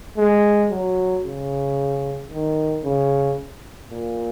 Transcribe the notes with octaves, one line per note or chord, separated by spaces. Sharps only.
G#3
F#3
C#3
D#3
C#3
A#2